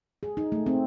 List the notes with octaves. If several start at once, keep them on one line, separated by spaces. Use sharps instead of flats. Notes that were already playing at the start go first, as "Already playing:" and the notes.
G#4
D#4
A3
C4